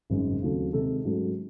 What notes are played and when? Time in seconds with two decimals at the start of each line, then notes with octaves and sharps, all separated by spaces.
0.10 G#1 F#2 C#3 G#3
0.42 D#2 C#3 F#3 A3 C4
0.73 C3 D#3 G#3 D#4 A4
1.05 G#2 F#3 A3 C#4